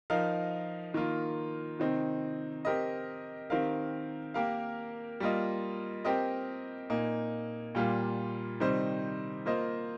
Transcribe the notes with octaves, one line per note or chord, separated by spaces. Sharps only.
F3 D#4 A#4 F5
D#3 A#3 F4
C3 D#3 C4 D#4
C4 G4 A#4 D#5
D#3 C4 G4 A#4 F5
A#3 G4 A#4 F5
G3 A#3 F4 D#5
C4 G4 A#4 D#5
A#2 A#3 D#4
A#2 G3 A#3 F4
C3 D#3 G3 D#4 C5
A#3 F4 C5 D#5